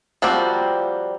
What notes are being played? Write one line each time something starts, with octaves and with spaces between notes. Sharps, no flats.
F3 G3 A#3 C4 F#4